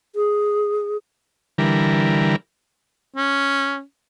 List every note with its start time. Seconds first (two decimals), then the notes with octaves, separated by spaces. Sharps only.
0.15 G#4
1.58 D3 E3 G3 A#4
3.16 C#4